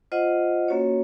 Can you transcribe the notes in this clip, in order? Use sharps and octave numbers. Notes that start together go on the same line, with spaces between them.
F4 C5 D#5 F#5
A#3 C#4 F#4 C#5